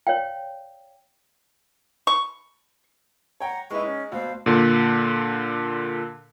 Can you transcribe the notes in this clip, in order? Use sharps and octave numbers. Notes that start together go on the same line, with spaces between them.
C#5 D5 F5 G5
C#6
C#5 F#5 G5 A#5
G#3 D#4 E4 B4 C#6
C#4
D2 B2 C5 F5
A#2 D3